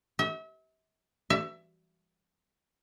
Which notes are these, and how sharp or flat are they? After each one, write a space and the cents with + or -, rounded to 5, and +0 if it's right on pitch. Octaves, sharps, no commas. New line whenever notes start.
E5 -40
E5 +20